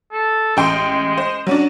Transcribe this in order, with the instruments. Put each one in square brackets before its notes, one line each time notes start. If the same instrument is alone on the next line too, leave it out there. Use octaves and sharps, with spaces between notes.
[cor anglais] A4
[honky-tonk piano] A1 G5 C6 [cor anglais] G#3
[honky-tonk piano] C5
F#3 C#4 D4